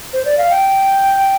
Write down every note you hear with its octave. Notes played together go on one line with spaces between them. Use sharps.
C5
D5
F5
G5